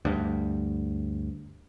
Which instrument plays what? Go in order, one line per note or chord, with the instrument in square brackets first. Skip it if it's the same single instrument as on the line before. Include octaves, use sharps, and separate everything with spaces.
[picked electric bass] D2 G2